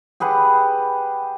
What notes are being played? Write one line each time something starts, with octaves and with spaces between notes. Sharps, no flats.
G4 G#4 B4 F#5